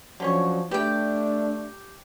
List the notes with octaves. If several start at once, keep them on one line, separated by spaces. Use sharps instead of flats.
D3 F3 F#3 C#4 C#5
A3 D4 G4 B4 D5 G5